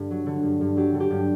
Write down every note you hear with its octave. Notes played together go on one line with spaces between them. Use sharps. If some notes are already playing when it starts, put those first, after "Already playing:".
Already playing: G2 D3
F#3
D3
G2
G2
F#3 G4
D3
G4
G2